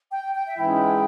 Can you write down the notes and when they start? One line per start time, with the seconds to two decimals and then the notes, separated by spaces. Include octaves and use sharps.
0.12 G5
0.34 G5
0.47 E5
0.58 G#2 E3 G#3 C#4 E4 G5